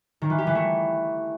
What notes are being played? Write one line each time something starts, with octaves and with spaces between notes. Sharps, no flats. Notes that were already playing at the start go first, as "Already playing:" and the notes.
D#3
E3
G4
E3
A3